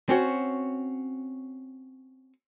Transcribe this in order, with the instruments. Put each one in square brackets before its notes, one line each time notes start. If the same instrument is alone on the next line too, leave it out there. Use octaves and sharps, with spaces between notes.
[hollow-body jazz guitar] C4 C#4 F#4